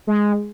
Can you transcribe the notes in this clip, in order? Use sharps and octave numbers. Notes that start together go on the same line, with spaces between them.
G#3